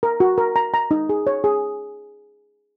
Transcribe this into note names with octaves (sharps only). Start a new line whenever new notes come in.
A#4
F#4
A#4
A#5
A#5
D#4
G#4
C#5
G#4